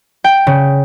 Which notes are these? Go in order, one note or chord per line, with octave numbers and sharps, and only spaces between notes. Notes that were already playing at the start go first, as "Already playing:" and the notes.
G5
C#3